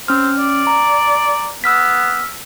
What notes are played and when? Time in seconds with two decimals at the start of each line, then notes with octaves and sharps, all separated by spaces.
0.08 C4 C#4 F6
0.38 D5
0.67 A#5
1.64 B3 E6 F6 B6